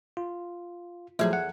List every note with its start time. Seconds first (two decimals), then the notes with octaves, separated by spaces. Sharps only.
0.17 F4
1.19 E2 F3 F#3 A3 G#4 E5
1.33 F#5